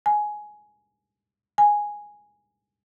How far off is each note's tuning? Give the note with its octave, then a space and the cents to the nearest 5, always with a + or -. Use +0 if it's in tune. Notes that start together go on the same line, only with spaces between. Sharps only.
G#5 +10
G#5 -5